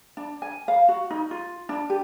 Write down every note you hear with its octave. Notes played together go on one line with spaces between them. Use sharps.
D4
G#5
F5
F#4
D#4
F4
D4
G4